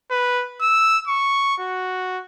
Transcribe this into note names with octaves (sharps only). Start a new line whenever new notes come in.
B4
E6
C#6
F#4